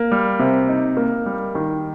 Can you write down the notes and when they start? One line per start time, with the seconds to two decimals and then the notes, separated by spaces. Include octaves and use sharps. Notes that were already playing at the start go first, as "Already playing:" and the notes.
Already playing: A#3
0.12 G3
0.39 C3
0.69 D#4
0.97 A#3
1.26 G3
1.55 D#3